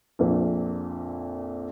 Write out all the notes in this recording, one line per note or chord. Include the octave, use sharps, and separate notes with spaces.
A#1 F2 A#2